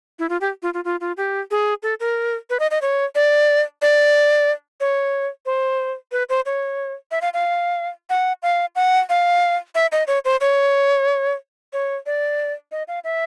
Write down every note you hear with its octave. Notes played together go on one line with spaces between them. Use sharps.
E4
F4
G4
F4
F4
F4
F4
G4
G#4
A4
A#4
B4
D#5
D#5
C#5
D5
D5
C#5
C5
B4
C5
C#5
E5
F5
F5
F#5
F5
F#5
F5
E5
D#5
C#5
C5
C#5
C#5
D5
D#5
F5
E5